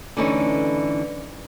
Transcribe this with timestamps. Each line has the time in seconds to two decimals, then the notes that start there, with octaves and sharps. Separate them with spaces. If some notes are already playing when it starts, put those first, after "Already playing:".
0.17 D3 E3 A3 C#4 D#4